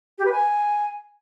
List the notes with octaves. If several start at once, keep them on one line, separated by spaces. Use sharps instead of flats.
G4
B4
G#5